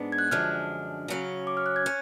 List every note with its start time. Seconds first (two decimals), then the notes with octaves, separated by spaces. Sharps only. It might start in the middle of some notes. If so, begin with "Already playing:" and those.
Already playing: G#2 G#3 B3 D4
0.12 G#6
0.19 F#6
0.31 F#2 D3 F3 G#3 D4 F6
1.08 C#3 F#3 C#4
1.47 D6
1.57 F6
1.66 F#6
1.76 G#6
1.86 C#4